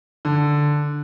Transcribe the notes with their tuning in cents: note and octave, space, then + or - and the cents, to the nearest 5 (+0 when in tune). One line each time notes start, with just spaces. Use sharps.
D3 +0